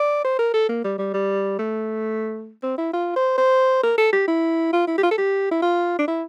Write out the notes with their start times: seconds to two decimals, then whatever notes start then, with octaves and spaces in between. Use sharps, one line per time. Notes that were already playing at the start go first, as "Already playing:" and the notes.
Already playing: D5
0.24 C5
0.39 A#4
0.54 A4
0.69 A#3
0.85 G3
0.98 G3
1.14 G3
1.59 A3
2.63 C4
2.78 E4
2.93 F4
3.16 C5
3.38 C5
3.83 A#4
3.98 A4
4.13 G4
4.28 E4
4.73 F4
4.87 E4
4.98 G4
5.03 F4
5.11 A4
5.18 G4
5.51 E4
5.62 F4
5.99 D4
6.08 E4